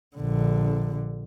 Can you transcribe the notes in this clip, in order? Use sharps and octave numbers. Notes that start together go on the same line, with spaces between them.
A#1 D3